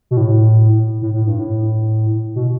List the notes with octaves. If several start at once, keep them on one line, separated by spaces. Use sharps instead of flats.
B2
A2
A2
A2
G2
A2
B2